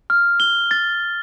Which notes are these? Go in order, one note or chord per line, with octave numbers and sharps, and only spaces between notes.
F6
G7
A6